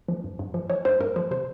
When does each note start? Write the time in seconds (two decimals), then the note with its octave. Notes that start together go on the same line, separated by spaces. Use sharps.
0.08 F3
0.24 G2
0.39 G2
0.54 F3
0.70 F3 C#5
0.85 G2 C5
1.00 G2 A#4
1.16 F3 C5
1.31 C3 C5